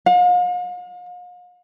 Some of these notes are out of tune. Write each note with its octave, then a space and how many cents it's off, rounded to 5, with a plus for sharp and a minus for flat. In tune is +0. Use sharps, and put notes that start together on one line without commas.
F5 +45